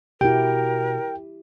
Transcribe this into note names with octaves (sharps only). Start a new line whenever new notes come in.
B2 E4 F#4 G4 A#4 G5